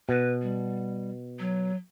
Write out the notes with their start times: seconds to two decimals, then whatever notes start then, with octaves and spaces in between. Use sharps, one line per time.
0.09 B2 B4
0.42 G3
1.39 F#3